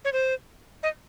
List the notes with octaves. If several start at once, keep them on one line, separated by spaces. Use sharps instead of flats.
C#5
C5
D#5